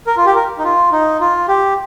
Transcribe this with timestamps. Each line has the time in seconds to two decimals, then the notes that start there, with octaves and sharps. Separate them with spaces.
0.07 A#4
0.17 F4
0.26 G4
0.35 A#4
0.58 D#4
0.64 F4
0.92 D#4
1.20 F4
1.48 G4